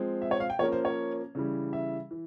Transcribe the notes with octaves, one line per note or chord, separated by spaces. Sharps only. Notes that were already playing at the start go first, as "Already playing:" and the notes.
Already playing: F3 G#3 C4
E5
C#5
F5
G5
F3 A#3 C#4 C#5
C5
C#5
C#3 E3 G3
E5
E3